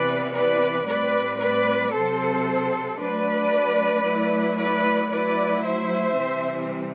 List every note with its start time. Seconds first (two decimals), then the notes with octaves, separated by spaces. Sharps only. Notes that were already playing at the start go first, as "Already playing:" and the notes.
Already playing: C3 E3 B3 B4 D5
0.35 B4 D5
0.87 A2 G3 C4 B4 D5
1.40 B4 D5
1.94 C3 F#3 C4 A4 C5
2.99 F#3 A3 D4 B4 D5
4.05 F#3 A3 E4
4.58 B4 D5
5.11 F#3 A3 E4 B4 D5
5.64 C5 E5
6.17 C3 E3 G3 C4